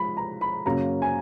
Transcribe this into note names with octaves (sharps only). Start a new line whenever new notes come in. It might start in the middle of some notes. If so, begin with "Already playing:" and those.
Already playing: F3 G#3 B5
A#5
B5
F#2 C#3 F#3 A#3 A#5
G#5